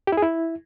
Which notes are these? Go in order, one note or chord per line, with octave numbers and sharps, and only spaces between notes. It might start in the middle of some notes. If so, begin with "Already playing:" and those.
G4
E4
G#4
E4